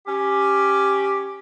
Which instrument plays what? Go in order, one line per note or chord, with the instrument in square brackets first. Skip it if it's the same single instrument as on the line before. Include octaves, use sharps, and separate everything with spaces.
[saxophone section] C#4 G4